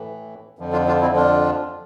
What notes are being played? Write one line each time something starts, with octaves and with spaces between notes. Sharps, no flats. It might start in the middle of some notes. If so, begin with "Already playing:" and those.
Already playing: A2 E3
F2 D3 F3
D4 F4
D4 F4
C4 E4
D4 F4